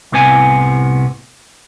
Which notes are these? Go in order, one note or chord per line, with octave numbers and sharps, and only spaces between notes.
C2 A2 C3 B3 G#5